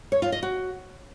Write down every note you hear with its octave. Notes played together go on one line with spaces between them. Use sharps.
C#5
F4
D#5
F#4